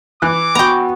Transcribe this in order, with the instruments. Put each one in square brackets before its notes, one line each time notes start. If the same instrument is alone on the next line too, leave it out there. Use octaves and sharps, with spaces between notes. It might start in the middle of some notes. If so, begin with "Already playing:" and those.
[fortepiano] E3 F#6 [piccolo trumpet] D6
[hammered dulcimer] B3 F#4 [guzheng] G5 A#5